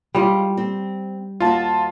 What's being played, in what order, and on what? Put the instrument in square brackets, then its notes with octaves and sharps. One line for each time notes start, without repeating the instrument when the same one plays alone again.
[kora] G3 [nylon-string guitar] G#3 F4
[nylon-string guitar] C4
[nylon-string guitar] D#2 F#4 [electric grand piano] F4 A5